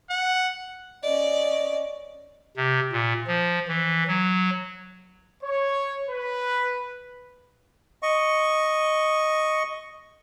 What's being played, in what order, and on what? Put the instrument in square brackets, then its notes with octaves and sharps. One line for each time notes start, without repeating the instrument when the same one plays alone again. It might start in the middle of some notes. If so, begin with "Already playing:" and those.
[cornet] F#5
[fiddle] C#4 D5 [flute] D#5
[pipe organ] C3
A#2
F3
E3
F#3
[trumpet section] C#5
B4
[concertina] D#5 C#6